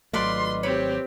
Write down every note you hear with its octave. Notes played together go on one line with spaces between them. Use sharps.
G#1 F#3 A3 F4 B4 D5 D#5 C6
C4 G4 C#5 B5